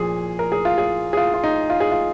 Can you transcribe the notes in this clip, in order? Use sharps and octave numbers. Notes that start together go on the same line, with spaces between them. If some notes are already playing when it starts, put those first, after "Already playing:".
Already playing: A#2 F3 G#4
A#4
G#4
F4
G#4
G#4
F4
F4
D#4
F4
G#4
F4